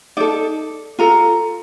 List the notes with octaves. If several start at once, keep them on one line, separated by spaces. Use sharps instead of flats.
D#4 A4 D5
F4 A4 A#5